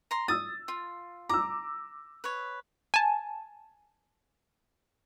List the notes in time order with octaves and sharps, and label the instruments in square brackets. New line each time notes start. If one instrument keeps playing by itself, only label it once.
[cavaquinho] A#5 C6
[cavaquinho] D#6 [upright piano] E6 A6
[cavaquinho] F4
[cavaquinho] A#5 [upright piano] D6 E6
[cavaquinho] B4 C#5
[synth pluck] G#5 A5